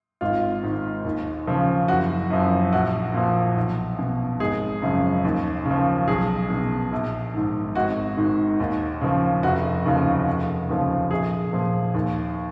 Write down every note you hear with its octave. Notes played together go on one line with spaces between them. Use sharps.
G#1 F4
G#2 D#3
D#2
C#3 F3
F#1 F#4
F#2 F3
A#1 F#4
A#2 F3
B1
B2
G#1 G#4
F#2 C#3 F3
D#2
C#3
F3
B1 G#4
B2
A#1
G#2 D#3
G#1 F#4
G#2 D#3
D#2
C#3 F3
F1 F#4
D#2 C#3 F3
F1
D#2 C#3 F3
A#1 G#4
A#2 F3
D#2